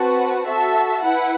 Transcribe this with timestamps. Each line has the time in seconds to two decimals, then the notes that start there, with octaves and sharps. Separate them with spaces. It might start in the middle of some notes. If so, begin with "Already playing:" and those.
Already playing: C4 F#4 B4 F#5 A5
0.46 F#4 A4 E5 A5
1.03 E4 B4 F#5